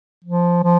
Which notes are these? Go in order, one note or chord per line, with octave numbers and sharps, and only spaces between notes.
F3
F3